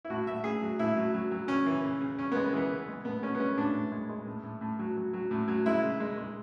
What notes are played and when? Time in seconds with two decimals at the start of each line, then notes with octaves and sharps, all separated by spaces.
0.05 E4
0.10 A2 F#4
0.27 A2 E5
0.44 A2 G#4
0.62 F#3
0.79 A2 E4
0.96 F#3
1.14 F#3
1.31 F#3
1.48 C#3 C#4
1.66 E3
1.83 C#3
2.00 C#3
2.18 C#3 C#4
2.32 G#3 B3
2.53 E3 B3
2.71 C#3
2.88 G#3
3.05 A2 B3
3.22 G#3 C#4
3.35 B3
3.39 G#3 C#4
3.57 A2 D4
3.75 A2
3.92 G#3
4.09 G#3
4.26 A2
4.43 A2
4.61 A2
4.79 F#3
4.97 F#3
5.13 F#3
5.31 A2
5.48 F#3
5.66 G#3 E4
5.83 C#3
6.00 G#3
6.18 G#3